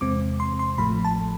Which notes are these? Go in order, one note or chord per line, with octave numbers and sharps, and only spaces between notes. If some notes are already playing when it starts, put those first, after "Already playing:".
E2 C3 G#3 C4 D6
C6
C6
A1 A2 F3 A3 B5
A5